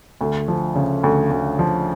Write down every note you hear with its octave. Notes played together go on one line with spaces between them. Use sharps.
D2
F3
C#3
D2
D2
F3